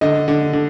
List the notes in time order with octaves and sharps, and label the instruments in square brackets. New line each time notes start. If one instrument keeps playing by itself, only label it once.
[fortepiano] D3 D#5
D3
D3